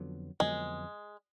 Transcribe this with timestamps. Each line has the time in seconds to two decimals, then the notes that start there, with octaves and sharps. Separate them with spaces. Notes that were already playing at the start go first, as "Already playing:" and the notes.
Already playing: F2 D3 F#3 B3
0.40 F2 D3 F#3 G#3 B3